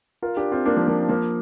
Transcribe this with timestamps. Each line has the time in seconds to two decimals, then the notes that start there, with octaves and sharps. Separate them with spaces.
0.22 F4 A#4
0.37 D4 G4
0.52 C4 F4
0.66 A#3 D4
0.76 F3 A#3
0.87 F3 A#3
1.09 F3 A#3